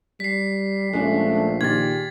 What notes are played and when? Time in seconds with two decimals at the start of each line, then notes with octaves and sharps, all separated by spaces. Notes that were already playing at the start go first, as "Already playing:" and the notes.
0.20 G3 B6 C7
0.93 A#1 G#3 A3 C#4 D4
1.61 A#2 D#3 G4 G#4 G#6 A6